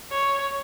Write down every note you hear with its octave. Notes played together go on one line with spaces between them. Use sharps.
C#5